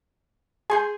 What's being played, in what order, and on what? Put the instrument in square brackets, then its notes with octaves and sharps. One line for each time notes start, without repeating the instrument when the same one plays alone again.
[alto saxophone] G#4 [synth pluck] G#5 C6 G6